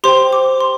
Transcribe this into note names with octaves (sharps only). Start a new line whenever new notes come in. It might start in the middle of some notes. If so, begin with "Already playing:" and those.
G4 C5 G5 C6
D6
C6